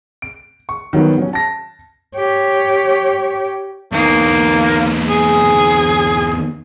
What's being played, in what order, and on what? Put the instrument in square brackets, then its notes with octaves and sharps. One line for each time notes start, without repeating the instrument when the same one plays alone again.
[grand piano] D7
C#6
D#3 F#3 G3 B3
F#3 C#4
A5 A#6
[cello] G4 C#5
[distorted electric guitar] E2 D#4 [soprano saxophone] A#3
[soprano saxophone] G#4